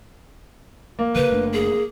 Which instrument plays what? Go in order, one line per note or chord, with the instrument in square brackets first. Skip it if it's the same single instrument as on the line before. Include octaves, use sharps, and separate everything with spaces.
[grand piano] A#3
[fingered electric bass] C#3 E3 [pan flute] B4
[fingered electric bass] F#1 A3 D4
[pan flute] G#4